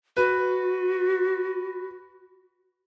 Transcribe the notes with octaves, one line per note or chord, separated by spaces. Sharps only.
F#4 B4